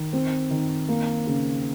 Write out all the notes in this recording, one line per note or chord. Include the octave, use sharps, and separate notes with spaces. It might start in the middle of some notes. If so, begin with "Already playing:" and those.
Already playing: D#3
C4
D#3
A#3
C#3